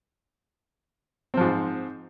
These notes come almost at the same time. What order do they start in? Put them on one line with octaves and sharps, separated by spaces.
C4 F3 G#2